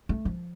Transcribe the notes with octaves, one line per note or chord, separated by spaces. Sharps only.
A3
F3